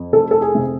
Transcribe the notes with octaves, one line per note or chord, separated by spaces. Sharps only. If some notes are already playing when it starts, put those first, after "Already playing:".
Already playing: F2
F1 A4
A4
G#4
C3